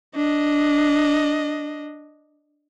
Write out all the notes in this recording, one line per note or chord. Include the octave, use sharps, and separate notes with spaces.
D4 D#5